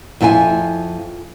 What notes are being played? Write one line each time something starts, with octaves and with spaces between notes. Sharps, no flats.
F2 E4 F4 G5 G#5